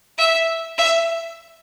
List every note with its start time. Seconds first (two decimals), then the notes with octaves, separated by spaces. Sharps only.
0.18 E5
0.78 E5